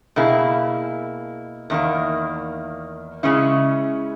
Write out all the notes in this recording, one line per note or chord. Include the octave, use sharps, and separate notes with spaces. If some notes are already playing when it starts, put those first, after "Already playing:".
B2 A#3 E4 G#4
E2 D#3 A#3
C#3 G#3 C#4 E4